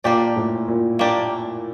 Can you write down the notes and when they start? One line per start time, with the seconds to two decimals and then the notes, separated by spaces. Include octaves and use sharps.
0.04 A#2 A#3 D4 G4 D5
0.36 A2
0.68 A#2
0.99 A#3 D4 G4 D5